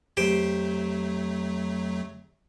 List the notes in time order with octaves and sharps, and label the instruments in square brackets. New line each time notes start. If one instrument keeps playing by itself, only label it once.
[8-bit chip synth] F2 F#3 A3 [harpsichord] G4 C5